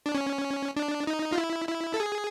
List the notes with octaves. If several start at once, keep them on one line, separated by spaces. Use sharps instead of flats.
D4
C#4
D4
D#4
F4
E4
E4
A4
G#4